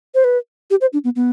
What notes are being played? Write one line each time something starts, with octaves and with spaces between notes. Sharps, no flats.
C5
B4
G4
C5
D4
B3
B3